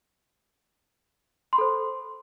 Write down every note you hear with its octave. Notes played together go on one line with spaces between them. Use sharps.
A4 C5 B5 C6